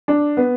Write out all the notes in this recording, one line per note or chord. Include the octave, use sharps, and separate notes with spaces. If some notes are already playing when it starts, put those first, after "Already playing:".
D4
B3